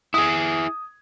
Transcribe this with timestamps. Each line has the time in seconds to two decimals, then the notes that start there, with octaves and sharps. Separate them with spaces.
0.14 E4 G#4 D#6 G#6